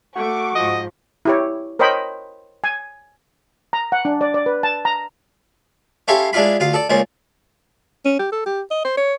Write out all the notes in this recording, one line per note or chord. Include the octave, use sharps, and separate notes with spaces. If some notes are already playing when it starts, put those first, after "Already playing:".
A3 F#4 C#6 D6
G#2 F3 D#5
E4 G4 C#5
A#4 C5 C#5 D#5 G5 B5
G#5
A#5
F#5
D4
D5
D5
B4
A5
A#5
C#4 E4 G4 A4 F5 C6
G#3 D4 E4 F4 B5
D2 F4 F5
A4 D5
C#2 A#2 C#4 C5
C#4
G4
A4
G4
D#5
C5
C#5